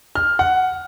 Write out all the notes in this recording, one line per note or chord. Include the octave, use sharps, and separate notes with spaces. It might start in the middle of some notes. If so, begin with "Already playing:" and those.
F6
F#5